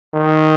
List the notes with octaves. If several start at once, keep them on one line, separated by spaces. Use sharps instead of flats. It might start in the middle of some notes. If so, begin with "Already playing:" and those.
D#3